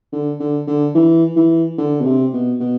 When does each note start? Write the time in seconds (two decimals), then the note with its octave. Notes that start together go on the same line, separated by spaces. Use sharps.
0.12 D3
0.40 D3
0.67 D3
0.95 E3
1.36 E3
1.78 D3
2.01 B2
2.05 C3
2.33 B2
2.60 B2